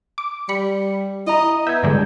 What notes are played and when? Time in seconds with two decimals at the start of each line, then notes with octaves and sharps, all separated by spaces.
0.18 D6
0.49 G3 B5 C#7
1.27 E4 D#5 A#5
1.67 B3 E5 G6 G#6
1.83 G2 D3 G#3